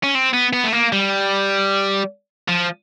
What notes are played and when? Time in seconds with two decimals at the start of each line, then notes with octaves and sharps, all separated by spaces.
0.03 C#4
0.15 C4
0.33 B3
0.53 B3
0.64 A3
0.72 A#3
0.93 G3
2.48 F3